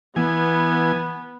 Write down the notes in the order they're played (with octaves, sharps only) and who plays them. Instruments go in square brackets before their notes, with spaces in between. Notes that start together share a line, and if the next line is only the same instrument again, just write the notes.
[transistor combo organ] E3 G#5 [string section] B3